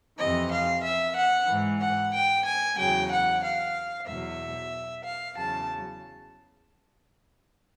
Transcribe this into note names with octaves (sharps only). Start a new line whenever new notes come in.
F2 C3 E3 D#5
F5
E5
F#5
G#2 E3
F#5
G5
G#5
E2 C#3 F#3 G5
F#5
F5
E2 B2 F#3 E5
F5
E2 C#3 F#3 A5